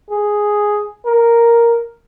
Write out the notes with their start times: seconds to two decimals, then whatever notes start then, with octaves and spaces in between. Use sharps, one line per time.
0.10 G#4
1.05 A#4